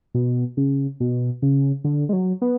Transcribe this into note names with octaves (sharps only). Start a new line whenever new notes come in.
B2
C#3
B2
C#3
D3
G#3
F#3
B3